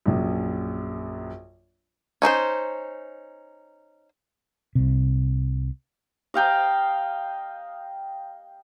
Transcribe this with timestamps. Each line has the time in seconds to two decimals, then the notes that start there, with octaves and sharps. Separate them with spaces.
0.06 A#1 F#2
2.22 C#4 D#4 E4 C5
4.75 C2 C3
6.34 D#5 F5 G5 A#5